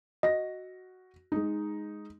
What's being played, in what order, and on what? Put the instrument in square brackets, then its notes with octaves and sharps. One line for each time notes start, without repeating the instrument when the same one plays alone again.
[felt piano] F#4 A#6 [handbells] D#5
[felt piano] G#3 D#4